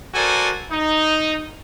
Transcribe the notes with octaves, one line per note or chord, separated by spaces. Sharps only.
F#4 A4 A#4 C5 D5 G#5
D#4